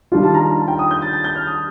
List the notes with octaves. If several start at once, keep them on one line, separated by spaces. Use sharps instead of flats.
D#3 G3 D4 F4
A5
A#5
A#5
A5
G5
D#6
G6
A6
A6
G6
F6
D#6